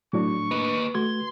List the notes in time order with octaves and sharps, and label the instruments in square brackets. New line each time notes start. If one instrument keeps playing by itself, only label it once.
[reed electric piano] A2 D4 [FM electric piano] F#3 [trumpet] C#6
[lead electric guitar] A#3 D#5 [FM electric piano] B4
[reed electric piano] A3 F#4 G#6 [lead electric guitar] C6